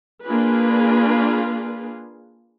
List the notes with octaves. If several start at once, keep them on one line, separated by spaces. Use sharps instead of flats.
A#3 D4 F4 G#4 B4